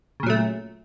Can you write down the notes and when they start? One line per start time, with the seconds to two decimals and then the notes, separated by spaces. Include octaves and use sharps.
0.20 C#3
0.23 A#2
0.26 F#3
0.30 A3